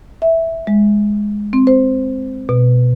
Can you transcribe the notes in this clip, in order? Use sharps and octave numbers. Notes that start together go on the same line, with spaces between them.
E5
G#3
C4
C5
B2